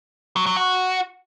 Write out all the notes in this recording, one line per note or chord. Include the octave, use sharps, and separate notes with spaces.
F#3
F#3
F#4